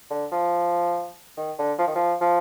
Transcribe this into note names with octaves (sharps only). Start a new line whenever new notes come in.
D3
F3
D#3
D3
F3
D#3
F3
F3